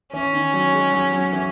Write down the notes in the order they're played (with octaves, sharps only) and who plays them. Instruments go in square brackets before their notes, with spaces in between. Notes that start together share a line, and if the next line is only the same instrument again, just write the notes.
[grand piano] E3 [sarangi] C#4
[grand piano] D#3
F#3
G#3
F#3
F#3
E3